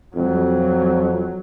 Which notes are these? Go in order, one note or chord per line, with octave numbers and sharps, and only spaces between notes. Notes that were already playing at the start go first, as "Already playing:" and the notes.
F2 F#3